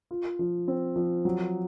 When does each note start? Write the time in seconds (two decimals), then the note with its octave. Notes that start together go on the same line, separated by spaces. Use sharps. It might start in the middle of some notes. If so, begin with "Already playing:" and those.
0.11 F4
0.39 F3
0.68 C4
0.96 F3
1.25 F#3